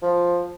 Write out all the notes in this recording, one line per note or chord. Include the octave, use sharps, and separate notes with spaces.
F3